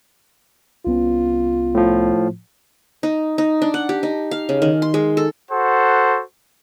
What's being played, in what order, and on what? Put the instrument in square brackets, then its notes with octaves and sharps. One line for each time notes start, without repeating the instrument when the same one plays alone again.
[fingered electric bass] C2 B3 C#4 [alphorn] F4
[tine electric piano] A2 F3
[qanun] D#4
D#4
D4
F#5
G4
D#4
F5
C#3
D#3
C6
G#3
A4
[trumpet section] F#4 A4 C5 F#5